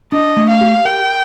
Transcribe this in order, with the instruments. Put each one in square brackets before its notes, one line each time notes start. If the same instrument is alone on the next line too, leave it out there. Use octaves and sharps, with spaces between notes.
[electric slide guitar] D4 [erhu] D#5
[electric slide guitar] A3
[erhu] F5
[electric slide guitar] G4
[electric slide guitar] A#4 [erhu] G5